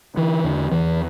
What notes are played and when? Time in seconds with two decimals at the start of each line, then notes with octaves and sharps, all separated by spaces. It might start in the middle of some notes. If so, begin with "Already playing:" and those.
0.17 D3 E3
0.44 E2 D3
0.72 E2 E3